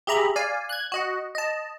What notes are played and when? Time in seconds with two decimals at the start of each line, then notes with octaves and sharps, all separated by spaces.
0.07 G4 G#4 E5 A#5 B5
0.36 D5 F5 G#5
0.69 F#6 G#6
0.92 F#4 D#5 F#5
1.35 D#5 A5